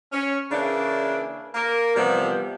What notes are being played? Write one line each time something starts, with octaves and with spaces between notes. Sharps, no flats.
C#4
C#3 E3 A#3 D4
A#3 A#4
C3 E3 F3 G3 B3